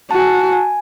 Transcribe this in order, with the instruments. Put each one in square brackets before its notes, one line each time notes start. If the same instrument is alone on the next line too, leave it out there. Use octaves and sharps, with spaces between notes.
[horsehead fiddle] F#4 [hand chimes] A5
[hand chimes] G#5
A5
G#5